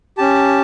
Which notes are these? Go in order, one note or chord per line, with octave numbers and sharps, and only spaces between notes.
C#4 G4 A5